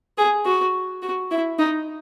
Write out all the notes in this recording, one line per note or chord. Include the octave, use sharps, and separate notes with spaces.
G#4
F#4
F#4
E4
D#4